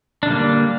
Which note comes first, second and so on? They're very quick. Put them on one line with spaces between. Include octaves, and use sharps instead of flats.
D4 D3 G3 A#3